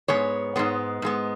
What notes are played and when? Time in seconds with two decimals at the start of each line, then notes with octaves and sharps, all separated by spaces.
0.08 G#2 G#3 B3 C#5
0.56 G#2 G#3 B3
1.02 G#2 G#3 B3